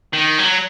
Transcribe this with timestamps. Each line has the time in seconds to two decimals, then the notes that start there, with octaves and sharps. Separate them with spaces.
0.13 D#3
0.38 F#3